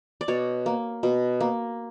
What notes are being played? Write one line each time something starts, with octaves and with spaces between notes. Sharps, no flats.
D5
B2 C#5
A#3
B2
A#3